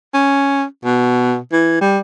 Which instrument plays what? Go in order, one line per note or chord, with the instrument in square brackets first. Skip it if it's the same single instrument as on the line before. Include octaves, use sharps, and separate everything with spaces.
[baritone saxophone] C#4
B2
E3
G3